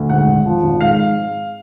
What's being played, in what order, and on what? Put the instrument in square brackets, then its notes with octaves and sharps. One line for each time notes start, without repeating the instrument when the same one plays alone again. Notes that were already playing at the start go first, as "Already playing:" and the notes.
Already playing: [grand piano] D2
G#2 F#5
G#1
F3
G#1
G#2 F5